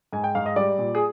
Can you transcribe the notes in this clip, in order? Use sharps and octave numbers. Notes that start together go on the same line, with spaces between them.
G#2 G#5
G5
G#2 F5
D#5
G3 D5
A#2
G#4